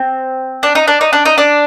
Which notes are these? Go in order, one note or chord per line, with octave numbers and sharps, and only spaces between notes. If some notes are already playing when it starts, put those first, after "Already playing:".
Already playing: C4
D4
D#4
D4
D#4
D4
D#4
D4